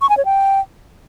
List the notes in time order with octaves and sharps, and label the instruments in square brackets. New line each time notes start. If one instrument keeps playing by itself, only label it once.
[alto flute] C#6
G#5
C#5
G5